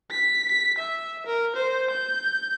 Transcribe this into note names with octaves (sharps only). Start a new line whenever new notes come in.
B6
B6
E5
A#4
C5
G6